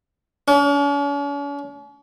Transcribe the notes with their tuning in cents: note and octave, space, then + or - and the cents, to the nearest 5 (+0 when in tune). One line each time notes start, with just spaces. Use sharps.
C#4 +45